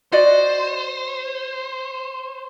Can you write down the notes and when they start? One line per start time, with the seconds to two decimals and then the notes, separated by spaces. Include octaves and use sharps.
0.12 F#4 C5 D5 D#5